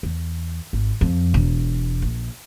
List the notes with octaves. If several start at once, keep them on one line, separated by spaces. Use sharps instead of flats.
E2
G#1
F2
E1
A#1